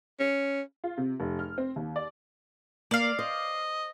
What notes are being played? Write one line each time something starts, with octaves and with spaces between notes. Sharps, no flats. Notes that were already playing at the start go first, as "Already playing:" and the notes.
C#4
F4
C3
F1
F6
C4
D#2
D5
A#3 D5 F5
C5 D#5